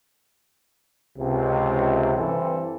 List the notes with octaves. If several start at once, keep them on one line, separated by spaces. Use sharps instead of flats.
C#2 C3
G2 E3 C4 A4